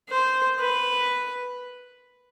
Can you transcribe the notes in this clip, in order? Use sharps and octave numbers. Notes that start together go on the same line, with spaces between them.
C5
B4